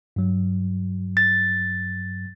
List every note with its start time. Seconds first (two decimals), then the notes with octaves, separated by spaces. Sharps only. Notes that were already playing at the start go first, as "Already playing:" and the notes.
0.16 G2 F#3
1.17 A6